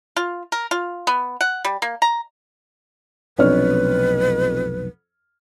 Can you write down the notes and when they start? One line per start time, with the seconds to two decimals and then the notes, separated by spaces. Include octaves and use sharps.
0.16 F4
0.52 A#4
0.71 F4
1.07 B3
1.41 F#5
1.65 G3
1.82 A#3
2.02 A#5
3.38 F1 B1 F2 D4 B4 C#5 F6